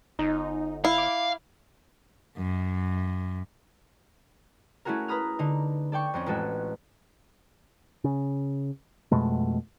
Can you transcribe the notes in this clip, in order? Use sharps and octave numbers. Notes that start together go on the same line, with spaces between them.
G1 D#4
E4 F5
D6
F#2
A3 C#4 E4 F#4 G#4 A#4
B4 A#5 B5 D#6 F6
D3 D#4
A4 D5 G5 C#6
F2 C4 C#4
A1 G#3 F#4 A4
C#3
F2 B2 G#3 A3